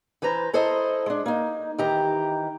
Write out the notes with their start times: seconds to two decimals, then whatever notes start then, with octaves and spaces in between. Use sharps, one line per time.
0.22 E3 B4 C5 A#5
0.54 E4 A4 C5 D#5
1.06 G#3 D4
1.26 A#3 D#4
1.78 D#3 E3 G4 A#5